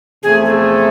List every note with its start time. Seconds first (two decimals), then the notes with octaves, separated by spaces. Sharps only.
0.23 E2 C3 F3 A3 G#4
0.45 A4
0.50 G#4